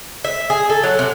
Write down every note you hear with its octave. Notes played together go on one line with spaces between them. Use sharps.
E5
G#4
A4
F#3
C3